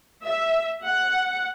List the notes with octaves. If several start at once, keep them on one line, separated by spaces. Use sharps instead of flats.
E5
F#5